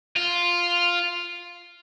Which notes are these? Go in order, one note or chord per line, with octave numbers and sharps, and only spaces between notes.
F4